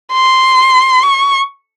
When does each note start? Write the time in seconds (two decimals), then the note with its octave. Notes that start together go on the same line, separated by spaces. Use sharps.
0.13 C6
1.03 C#6